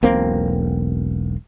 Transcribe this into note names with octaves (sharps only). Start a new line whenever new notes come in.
E1 B1 A#3 C4